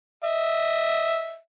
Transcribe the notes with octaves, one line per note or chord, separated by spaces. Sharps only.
D#5 E5